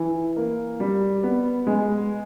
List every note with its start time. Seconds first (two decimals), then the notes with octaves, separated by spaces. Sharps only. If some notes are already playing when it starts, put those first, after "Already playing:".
Already playing: E3
0.36 A#3
0.80 G3
1.23 B3
1.67 G#3